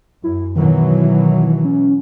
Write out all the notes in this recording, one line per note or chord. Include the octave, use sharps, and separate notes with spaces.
F#2 E4
B2 D#3 E3 F#3
C#4